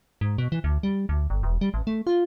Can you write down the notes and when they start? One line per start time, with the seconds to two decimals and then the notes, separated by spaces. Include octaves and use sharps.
0.21 G#2
0.38 B2
0.52 E3
0.64 D2
0.83 G3
1.09 D2
1.30 G1
1.43 E1
1.61 G3
1.74 A1
1.87 A3
2.07 F4